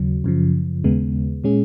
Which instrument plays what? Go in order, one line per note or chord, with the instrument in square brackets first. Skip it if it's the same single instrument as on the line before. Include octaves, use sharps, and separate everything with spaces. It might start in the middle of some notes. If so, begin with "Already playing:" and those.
Already playing: [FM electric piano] D#2 C#3 F#3
F#2 C#3 F3
D#2 C#3 G#3 B3
A#2 G#3 C#4 G#4